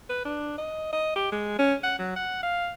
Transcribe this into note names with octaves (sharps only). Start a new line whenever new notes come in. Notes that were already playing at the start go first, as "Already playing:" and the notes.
B4
D4
D#5
D#5
G4
G#3
C#4
F#5
F#3
F#5
F5